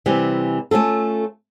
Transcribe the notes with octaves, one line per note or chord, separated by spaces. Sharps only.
C3 E3 G3
A3 C#4 F4 A4